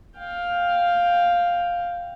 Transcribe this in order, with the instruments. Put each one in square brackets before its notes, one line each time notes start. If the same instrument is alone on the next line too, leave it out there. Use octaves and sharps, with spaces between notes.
[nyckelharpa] F5 G5